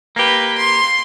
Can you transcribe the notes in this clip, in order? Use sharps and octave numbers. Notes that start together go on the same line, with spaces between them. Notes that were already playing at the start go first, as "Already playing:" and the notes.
A#3 G4 B4
C6